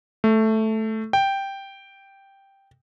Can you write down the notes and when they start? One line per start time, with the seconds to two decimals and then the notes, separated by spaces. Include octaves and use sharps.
0.24 A3
1.13 G5